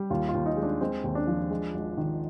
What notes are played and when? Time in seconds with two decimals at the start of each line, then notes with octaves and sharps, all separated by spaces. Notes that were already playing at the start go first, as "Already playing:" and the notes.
Already playing: G3
0.10 D#2 F4
0.29 F4
0.34 D#2
0.46 D#4
0.57 G#3
0.63 D4
0.81 G#3 C4
1.04 D#2
1.15 D4
1.27 F3
1.50 G#3
1.74 G#1
1.98 D#3